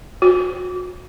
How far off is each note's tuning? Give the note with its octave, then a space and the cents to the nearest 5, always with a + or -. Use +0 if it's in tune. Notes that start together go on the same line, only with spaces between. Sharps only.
F#4 -35